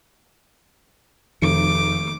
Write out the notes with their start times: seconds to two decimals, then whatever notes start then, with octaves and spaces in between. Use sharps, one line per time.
1.42 F1 D#3 D6